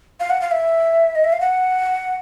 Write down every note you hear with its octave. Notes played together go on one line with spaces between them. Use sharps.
F5
F#5
F5
E5
D#5
E5
F5
F#5